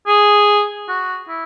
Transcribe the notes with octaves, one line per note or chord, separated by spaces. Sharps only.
G#4
F#4
E4